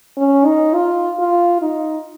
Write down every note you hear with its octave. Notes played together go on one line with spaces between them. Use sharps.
C#4
D#4
F4
F4
D#4